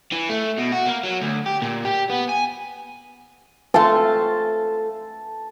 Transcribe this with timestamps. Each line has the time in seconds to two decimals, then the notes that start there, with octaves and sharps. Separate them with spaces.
0.12 E3
0.29 A3
0.58 B2
0.72 F#4
0.86 A#3
1.05 F#3
1.22 D2
1.46 G4
1.62 A#2
1.85 G4
2.10 B3
2.29 G#5
3.74 A3 C4 F4 A5